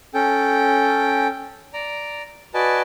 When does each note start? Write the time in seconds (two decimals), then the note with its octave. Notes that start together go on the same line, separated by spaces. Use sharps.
0.14 C#4 A4 G5
1.73 D5 A#5
2.54 F#4 B4 D5 D#5 G#5 A5